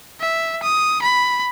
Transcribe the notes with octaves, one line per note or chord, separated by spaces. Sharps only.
E5
D#6
B5